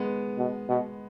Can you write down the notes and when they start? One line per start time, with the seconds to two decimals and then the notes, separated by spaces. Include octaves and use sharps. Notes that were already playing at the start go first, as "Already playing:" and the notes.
Already playing: G#3 B3
0.38 B2
0.69 B2